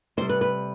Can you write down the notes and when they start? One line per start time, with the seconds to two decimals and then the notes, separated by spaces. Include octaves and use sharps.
0.17 C3 G3 C5
0.29 B4
0.41 B4